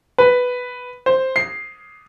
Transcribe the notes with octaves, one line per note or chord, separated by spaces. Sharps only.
B4
C5
C7